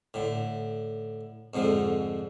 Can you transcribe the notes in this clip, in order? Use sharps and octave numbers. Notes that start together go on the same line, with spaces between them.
A2 D3
F2 G#2 D3 F3